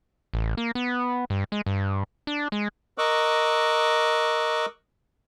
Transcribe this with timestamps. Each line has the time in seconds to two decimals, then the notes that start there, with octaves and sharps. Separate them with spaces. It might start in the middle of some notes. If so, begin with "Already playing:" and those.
0.34 A1
0.57 A#3
0.75 B3
1.30 G2
1.52 G#3
1.66 G2
2.27 D4
2.52 G#3
2.98 A#4 D#5 C#6 D6 E6 F#6